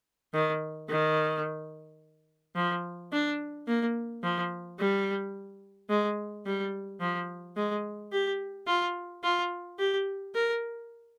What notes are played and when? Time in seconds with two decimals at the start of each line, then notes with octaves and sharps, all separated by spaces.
0.34 D#3
0.90 D#3
2.56 F3
3.12 D4
3.67 A#3
4.23 F3
4.79 G3
5.89 G#3
6.46 G3
7.00 F3
7.56 G#3
8.12 G4
8.67 F4
9.24 F4
9.79 G4
10.35 A#4